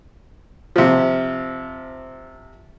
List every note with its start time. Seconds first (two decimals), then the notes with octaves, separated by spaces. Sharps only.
0.76 C3 F3